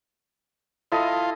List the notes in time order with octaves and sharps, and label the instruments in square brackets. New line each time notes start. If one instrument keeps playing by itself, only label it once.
[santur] E4 A4 D#5 [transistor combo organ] F4